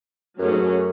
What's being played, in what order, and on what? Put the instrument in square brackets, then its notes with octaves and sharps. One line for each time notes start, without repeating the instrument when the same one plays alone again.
[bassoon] F#2 [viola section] F#3 A3 C#4 G#4
[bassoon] G#2
F#2